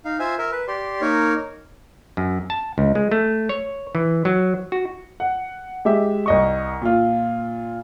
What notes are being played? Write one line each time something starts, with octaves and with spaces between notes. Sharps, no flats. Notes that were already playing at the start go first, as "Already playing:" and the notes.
D#4 F5
F4 C5 E5 G#5
A#4 E5
B4
G4 D5 C6
A#3 D#4 A#4 C#5
F#2
A5
C#2
G#3
A3
C#5
E3
F#3
F#4
F#5
G#3 G4 E5
C2 D#5 C#6
A#2 F4